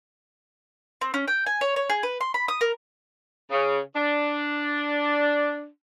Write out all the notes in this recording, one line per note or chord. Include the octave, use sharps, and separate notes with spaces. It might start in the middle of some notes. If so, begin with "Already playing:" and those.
C4
C#4
G5
G#5
C#5
C#5
G#4
B4
C6
B5
D#6
A#4
C#3
D4